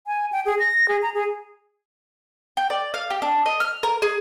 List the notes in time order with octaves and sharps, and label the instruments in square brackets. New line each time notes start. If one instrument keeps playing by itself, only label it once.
[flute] G#5
G5
G#4
A#6
G#4
A#5
G#4
[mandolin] G5
D5
F5
G4
D4
D#5
F6
A#4
G#4